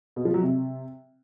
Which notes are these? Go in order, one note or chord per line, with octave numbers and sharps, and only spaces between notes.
B2
F3
F#3
C3